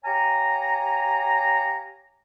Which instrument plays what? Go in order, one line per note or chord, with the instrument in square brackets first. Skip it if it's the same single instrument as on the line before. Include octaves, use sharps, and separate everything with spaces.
[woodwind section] G4 C#5 F5 G#5 A#5